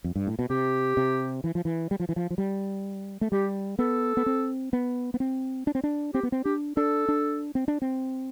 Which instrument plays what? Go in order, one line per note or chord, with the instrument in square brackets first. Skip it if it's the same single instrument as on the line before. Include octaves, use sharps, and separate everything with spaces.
[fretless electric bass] F2
G2
A2
B2
[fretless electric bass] C3 [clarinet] G4
[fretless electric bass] C3
E3
F3
E3
G3
F3
E3
F3
F3
G3
A3
[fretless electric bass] G3 [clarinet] G4
[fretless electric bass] B3 [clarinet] A4
[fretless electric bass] B3
C4
B3
B3
C4
D4
C4
D4
[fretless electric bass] C4 [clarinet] G4
[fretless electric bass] B3
C4
[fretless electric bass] D4 [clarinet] G4
[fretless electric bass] D4 [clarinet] A4
[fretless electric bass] D4
C4
D4
C4